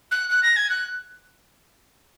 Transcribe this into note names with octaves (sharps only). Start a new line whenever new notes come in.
F#6
F#6
A#6
G#6
F#6